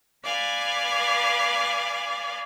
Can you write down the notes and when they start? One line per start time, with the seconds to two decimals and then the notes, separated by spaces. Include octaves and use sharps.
0.24 B4 D5 F5 G#5